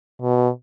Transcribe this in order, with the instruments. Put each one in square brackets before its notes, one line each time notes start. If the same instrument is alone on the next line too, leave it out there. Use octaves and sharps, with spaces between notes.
[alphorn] B2